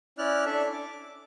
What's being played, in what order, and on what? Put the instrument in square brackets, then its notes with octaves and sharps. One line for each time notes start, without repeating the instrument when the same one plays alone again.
[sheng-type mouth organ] C#4 E4 D5 F6 F#6
D4 A4 E5
D6